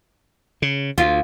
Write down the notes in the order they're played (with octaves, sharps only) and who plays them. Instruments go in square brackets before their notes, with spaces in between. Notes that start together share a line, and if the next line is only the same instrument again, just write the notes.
[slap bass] C#3
[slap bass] D2 [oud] F4